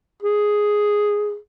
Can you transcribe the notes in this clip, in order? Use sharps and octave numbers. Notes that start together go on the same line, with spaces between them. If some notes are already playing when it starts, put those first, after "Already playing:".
G#4